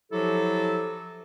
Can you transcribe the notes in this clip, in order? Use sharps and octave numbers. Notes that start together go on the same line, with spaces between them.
F3 F#3 E4 G4 A4